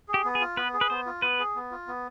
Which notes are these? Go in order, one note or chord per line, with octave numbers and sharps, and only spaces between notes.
G#4
G4
B3
G#4
F4
B3 B4
G#4
B4
B3 C5
F4
B3 B4
G#4
B3
F4
B3